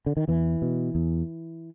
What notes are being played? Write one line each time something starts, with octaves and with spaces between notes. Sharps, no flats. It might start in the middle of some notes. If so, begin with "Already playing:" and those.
D3
D#3
E2 E3
B2
E2